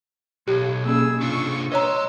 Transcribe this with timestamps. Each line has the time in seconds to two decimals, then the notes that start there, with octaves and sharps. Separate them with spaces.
0.48 B1 G4 C#5
0.85 A#3 C#4 G#4 E6
1.21 C3 D4 F4 C#6
1.72 B4 C#5 D#5 A#5 C6 E6